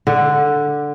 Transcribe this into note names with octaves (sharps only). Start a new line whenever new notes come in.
D3